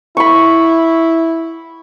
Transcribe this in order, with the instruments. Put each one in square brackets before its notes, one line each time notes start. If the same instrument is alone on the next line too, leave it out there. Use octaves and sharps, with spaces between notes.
[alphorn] E4 [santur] B5 C#6